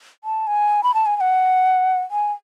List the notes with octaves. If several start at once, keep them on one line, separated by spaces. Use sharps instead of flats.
A5
G#5
B5
A5
G#5
G#5
F#5
G#5